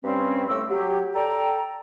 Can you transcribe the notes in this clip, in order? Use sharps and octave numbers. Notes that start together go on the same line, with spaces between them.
G2 G3 C4 C#4
D#2 A2 A3 D6 E6
F#3 G4
A4 D5 G5 A#5